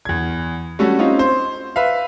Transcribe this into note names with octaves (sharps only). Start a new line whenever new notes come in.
E2 G#6
G3 A3 C#4 F#4 A4
C4 C#4 D#4 F4
C5
B4 E5 F5